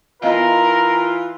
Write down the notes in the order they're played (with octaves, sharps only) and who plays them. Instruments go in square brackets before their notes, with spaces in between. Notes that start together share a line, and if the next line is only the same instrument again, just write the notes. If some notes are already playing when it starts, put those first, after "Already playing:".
[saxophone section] E3 F4 [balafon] B3 D#5 F5 [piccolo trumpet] A#4